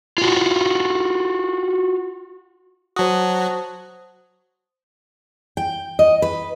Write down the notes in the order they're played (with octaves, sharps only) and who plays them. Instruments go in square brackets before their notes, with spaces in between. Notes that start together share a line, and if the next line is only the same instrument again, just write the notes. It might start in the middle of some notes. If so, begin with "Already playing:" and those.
[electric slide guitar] F4 F#4
[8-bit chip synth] F#3 F#4 [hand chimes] C5 A5 D#6
[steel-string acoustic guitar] G5
D#5
B4